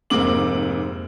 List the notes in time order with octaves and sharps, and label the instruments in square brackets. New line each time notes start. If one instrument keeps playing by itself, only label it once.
[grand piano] F1 G#2 A#3 C4 D6 F#7